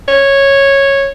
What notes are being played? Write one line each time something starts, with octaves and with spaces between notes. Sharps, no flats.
C#5